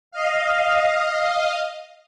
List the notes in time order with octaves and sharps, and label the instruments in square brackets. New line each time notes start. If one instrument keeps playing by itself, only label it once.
[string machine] D#5 F5